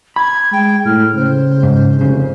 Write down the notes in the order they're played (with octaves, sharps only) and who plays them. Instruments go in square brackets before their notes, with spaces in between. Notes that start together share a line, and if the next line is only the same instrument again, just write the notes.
[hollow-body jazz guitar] B5 [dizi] G#6
[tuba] G#3 [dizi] G5
[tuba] A2 [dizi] F6
[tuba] C#3 [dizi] C5
[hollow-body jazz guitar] G#2
[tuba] F1 [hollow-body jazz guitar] C#3